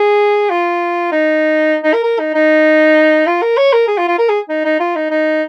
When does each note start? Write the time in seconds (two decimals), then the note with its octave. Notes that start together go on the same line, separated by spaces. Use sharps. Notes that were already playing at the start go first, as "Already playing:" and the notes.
Already playing: G#4
0.50 F4
1.12 D#4
1.84 D#4
1.94 A#4
2.04 A#4
2.20 D#4
2.34 D#4
3.26 F4
3.42 A#4
3.57 C#5
3.73 A#4
3.88 G#4
3.98 F4
4.08 F4
4.19 A#4
4.29 G#4
4.49 D#4
4.65 D#4
4.80 F4
4.96 D#4
5.11 D#4